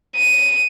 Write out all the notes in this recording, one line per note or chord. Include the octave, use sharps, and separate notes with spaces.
D#7